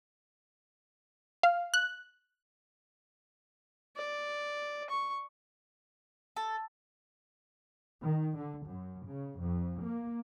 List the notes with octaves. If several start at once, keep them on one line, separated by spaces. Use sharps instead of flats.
F5
F#6
D5
C#6
A4
D#3
D3
F#2
C#3
F2
A#3